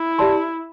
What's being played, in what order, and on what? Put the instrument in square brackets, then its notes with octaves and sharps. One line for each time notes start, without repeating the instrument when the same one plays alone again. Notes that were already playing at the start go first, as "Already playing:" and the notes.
Already playing: [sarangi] E4
[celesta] G4 D5 A5 C6